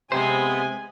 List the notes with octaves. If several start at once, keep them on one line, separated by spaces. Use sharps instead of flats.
C3 G#3 B3 C5 G#5